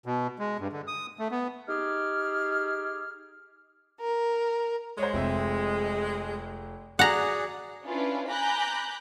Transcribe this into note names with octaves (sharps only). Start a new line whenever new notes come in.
B2
G#3
G2
D3
D#6
A3
B3
D#4 G4 G#4 F6
A#4
G#3 C5 C#5
F1 C4 E5
F#4 G#4 D5 F#5 G#5 A#5
C#4 D4 E4 F4 B4
G#5 A#5 B5 D6 F#6 G6